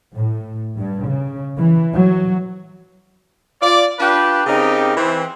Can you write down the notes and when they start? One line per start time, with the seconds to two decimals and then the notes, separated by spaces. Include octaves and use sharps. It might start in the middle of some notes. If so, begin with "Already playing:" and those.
0.14 A2
0.77 G2
1.06 C#3
1.58 E3
1.93 F#3
3.61 F4 D5
3.99 D4 F4 G4 B4
4.47 C#3 C4 D#4 G4 A#4
4.96 E3 C4